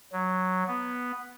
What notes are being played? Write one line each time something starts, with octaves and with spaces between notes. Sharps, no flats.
F#3
B3